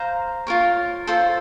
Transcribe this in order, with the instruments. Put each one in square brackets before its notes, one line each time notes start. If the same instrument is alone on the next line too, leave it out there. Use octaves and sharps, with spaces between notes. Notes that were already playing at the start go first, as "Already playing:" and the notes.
Already playing: [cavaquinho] C5 F5 A#5
F4 A#4 C#5
F4 A4 C5